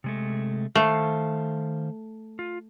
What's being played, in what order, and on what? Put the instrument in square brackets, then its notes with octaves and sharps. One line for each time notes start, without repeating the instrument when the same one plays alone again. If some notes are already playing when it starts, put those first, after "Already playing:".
[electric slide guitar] C3 G#3 A3
[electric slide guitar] D#3 C5 F5 [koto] A3
[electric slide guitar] F4